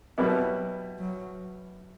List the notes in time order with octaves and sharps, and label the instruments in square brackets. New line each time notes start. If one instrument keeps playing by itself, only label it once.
[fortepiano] B2 G3 B3 E4 [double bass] F#3
[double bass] F#3